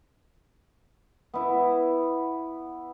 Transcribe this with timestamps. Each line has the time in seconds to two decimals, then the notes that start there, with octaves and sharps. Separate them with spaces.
1.34 B3 E4